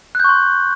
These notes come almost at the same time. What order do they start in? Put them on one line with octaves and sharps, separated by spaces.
F#6 G6 C#6 C6